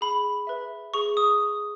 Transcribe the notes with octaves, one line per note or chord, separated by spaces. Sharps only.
G#4 B5
B4 E5
G#4 C#6
D#6